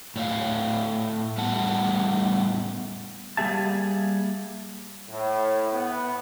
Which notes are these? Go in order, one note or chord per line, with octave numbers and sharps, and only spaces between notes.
A2 C#5 F5
A2 G3 B3 F#5 A5
G3 A#3 G4 G#4 E5 A5
A2
B3